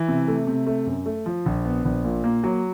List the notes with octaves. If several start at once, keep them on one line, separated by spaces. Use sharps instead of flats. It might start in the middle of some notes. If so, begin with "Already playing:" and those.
Already playing: E3
C3
A3
C3
A3
F#2
A3
F3
A#1
B3
A#1
A#2
A#3
F#3